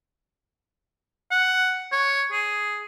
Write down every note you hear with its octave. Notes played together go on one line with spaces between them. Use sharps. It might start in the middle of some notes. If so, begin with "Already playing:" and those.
F#5
C#5
G#4